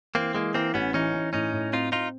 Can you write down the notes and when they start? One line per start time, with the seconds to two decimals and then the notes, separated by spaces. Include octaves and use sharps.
0.15 E3 A#3 C4
0.35 E3 G#3 A#3
0.54 E3 A#3 C4
0.74 A1 B3 C#4
0.94 E3 C#4 D#4
1.13 E3
1.33 A2 C#4 D#4
1.53 A2
1.73 C4 D#4 F4
1.92 C4 D#4 F4